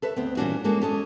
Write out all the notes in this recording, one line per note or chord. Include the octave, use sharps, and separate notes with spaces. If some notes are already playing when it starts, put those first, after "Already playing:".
A4 B4 C#5 E5
D2 B3 C4
A#2 E3 G3 C#4 D4 F#4
G#3 A#3 C#4 F#4 G#4 A4
C#4 A4 D#5